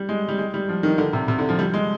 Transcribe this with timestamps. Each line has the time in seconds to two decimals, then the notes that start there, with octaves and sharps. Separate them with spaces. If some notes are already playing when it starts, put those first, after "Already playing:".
Already playing: G3
0.09 G#3
0.29 G3
0.38 G#3
0.54 G3
0.69 F3
0.83 D#3
0.98 D3
1.13 C3
1.28 C3
1.39 D3
1.49 F3
1.59 G3
1.74 G#3